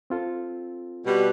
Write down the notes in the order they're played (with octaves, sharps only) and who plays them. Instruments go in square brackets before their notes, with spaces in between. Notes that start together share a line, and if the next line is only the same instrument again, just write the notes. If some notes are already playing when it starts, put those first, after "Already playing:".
[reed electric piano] C4 F4 A4
[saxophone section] B2 G3